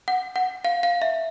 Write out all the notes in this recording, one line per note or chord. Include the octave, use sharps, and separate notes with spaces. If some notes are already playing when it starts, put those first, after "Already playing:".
F#5
F#5
F5
F5
E5